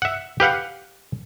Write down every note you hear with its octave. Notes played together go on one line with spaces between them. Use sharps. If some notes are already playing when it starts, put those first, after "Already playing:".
E5 F#5
G4 B4 F5 F#5